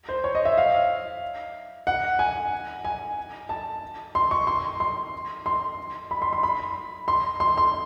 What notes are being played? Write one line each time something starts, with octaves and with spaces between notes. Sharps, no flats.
C5
C#5
D#5
E5
F5
F#5
G#5
G#5
A5
C6
C#6
C6
C6
C6
B5
C6
C6
B5
C6
C6
C6